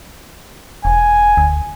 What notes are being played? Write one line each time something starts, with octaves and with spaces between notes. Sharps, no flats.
E1 G#5
D2